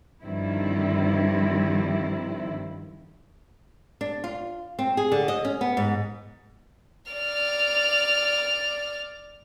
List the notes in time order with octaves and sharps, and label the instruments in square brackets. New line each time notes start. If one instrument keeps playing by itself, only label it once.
[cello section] G2 D3 D#3 F3 C4 E4
[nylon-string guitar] D4
F4
C4
G#4
D3
D#5
C#4
B3
G#2
[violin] D5 F6